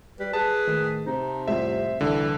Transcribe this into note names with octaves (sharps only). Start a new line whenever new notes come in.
G3 B4
G#4 B4 A5
A2 D#3
C3 C4 D#4
A1 F2 G3 C5 E5
C2 D3 E3 E4